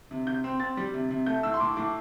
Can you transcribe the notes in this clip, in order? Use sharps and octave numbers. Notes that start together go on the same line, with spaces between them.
C3
C3 G6
C4
C4 A6
G3
C3
C3
A3 G6
A2 E6
C6
A2 D6
A2 D6